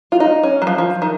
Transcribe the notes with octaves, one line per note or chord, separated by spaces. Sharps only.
F4
D#4
C#4
F#3
F3
F3
D#3